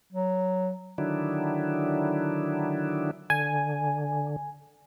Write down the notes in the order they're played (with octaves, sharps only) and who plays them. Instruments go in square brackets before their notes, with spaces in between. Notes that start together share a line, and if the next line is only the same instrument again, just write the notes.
[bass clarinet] F#3
[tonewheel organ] D3 D#3 F#3 D4 E4
[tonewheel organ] D3 [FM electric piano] G#5